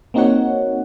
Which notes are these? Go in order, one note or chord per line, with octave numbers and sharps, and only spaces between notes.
A#3 C4 D#4 F#4 C#5 F#5